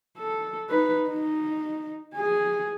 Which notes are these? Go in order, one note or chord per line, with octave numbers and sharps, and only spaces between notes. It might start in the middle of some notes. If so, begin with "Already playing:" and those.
A4
D#4 B4
D#4
G#4 G#5